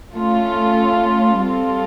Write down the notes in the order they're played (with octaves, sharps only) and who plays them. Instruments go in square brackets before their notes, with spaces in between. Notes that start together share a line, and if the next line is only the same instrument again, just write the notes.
[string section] A3 C#4 F4 A4
G3 C4 F4 A4